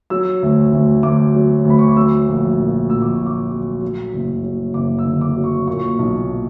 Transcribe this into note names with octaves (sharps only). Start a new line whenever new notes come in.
F#3 E6
D2
D2
D2 D6
F#3
D2 B5
C#6
D6
F#3 E6
A#1
A#2
A#1 E6
D6
C#6
F#3
D6
F#3
F#3
F#1
F#3
F#1 D6
E6
D3
D6
F#3
C#6
A#2 C#6
B1